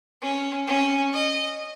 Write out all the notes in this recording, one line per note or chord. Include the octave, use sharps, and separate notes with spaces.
C#4
C#4
D#5